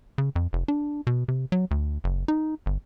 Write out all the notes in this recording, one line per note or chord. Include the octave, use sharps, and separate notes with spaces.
C#3
F2
F1
D4
B2
C3
F#3
D2
F#1
D#4
G1